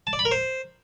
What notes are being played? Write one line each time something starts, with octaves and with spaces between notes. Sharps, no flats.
A5
D5
B5
A#4
C5